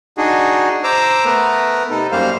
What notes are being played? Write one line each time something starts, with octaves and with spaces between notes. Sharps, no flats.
D4 D#4 F#4 G#4
C5 A#5 D6 E6
A3 B3 A#4 B4
C3 D#4 A4
F#2 G3 A#3 C5 F5